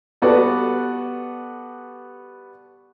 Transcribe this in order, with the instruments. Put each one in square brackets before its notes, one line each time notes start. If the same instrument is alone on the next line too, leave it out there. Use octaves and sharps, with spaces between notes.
[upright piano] G3 B3 F#4 A4 B4 D5